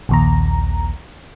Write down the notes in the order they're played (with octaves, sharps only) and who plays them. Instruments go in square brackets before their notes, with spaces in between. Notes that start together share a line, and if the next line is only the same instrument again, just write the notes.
[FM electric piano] A#1 D#2 A#5